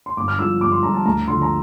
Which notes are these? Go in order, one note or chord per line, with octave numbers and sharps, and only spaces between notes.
C6
G1 D6
F6
G2 F3 E6
G1 D6
C6
G2 F3 A#5
A5
D2 A#5
D3 F3 C6
A#5